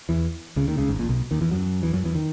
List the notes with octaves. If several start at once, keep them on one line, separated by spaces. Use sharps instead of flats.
E2 E3
C#2 C#3
D#2 D#3
C#2 C#3
G#1 G#2
A#1 A#2
B1 B2
D#2 D#3
E2 E3
F#2 F#3
E2 E3
F#2 F#3
E2 E3
D#3